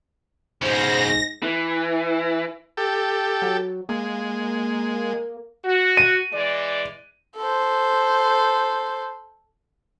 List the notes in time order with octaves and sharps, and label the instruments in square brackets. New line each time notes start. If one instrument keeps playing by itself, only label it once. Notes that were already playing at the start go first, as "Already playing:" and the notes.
[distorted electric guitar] B1 C#3 [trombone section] G#2 [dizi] C5 [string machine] A#6
[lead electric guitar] E3
[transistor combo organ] G4 A4
[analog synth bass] F#3
[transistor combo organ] G#3 [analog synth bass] A#3
[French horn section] F#4
[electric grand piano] D#7
[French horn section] E3 G#3 D5
[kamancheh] A4 C5